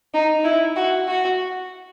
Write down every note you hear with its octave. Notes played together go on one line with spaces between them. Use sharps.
D#4
E4
F#4
F#4